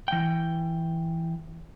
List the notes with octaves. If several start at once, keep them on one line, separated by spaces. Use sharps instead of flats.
E3 G5